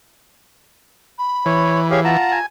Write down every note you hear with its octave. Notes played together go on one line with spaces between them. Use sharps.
B5
E3 C#5
G4 G#4 C#5 F5
F4 F#5 A5 A#5
G#5